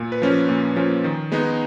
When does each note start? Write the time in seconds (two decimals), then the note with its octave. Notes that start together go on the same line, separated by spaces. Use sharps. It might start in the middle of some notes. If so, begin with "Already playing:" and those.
Already playing: A#2
0.12 B4
0.22 F3 A#3 C#4
0.30 A#4
0.49 A#2
0.76 F3 A#3 C#4
1.04 D#3
1.32 G#3 B3 D#4